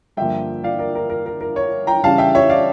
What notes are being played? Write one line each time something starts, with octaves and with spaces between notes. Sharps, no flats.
G2 D3 F3 A#3 E5 G5
D5 F5
A#4 D5
A#4
A#4
A#4
A#4
C#5
G5 A#5
C#3 E3 G3 C#4 F5 A5
E5 G5
C#5 E5
D5 F5